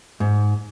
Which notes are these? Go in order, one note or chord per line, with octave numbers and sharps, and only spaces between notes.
G#2